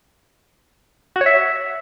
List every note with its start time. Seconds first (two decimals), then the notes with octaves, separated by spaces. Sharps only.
1.16 F#4
1.21 C#5
1.26 E5